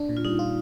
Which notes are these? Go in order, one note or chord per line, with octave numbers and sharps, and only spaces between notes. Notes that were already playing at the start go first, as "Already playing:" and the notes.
Already playing: D4
A#2
F4
G3 D#4
F4